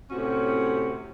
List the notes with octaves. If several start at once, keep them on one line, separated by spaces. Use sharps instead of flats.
A2 C3 C#4 F#4